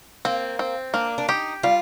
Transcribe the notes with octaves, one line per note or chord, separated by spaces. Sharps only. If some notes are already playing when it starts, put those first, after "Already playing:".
A#3 C4
C4
A#3 D4
D4
D#4 G4
G3 F4